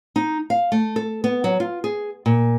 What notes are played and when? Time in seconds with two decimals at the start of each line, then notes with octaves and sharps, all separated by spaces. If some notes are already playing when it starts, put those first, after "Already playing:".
0.16 D#4
0.50 F5
0.72 A3
0.96 A4
1.24 B3
1.44 F#3
1.60 F4
1.84 G#4
2.26 A#2